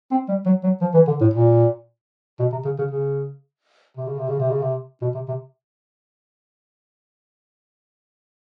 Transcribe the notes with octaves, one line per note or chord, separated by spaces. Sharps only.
C4
G3
F#3
F#3
F3
E3
D3
A2
A#2
B2
C3
C#3
C#3
C#3
C3
C#3
C3
C#3
C3
C#3
C3
B2
C3
C3